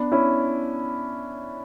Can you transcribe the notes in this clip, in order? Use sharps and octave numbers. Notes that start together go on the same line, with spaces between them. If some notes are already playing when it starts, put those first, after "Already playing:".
Already playing: B3 D4
C#4 E4